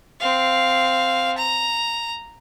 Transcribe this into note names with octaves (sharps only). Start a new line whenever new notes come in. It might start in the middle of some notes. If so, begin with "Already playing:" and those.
C4 F5
A#5